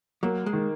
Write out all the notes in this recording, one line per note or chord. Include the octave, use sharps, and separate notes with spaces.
F#3 A#3
G#3
D#3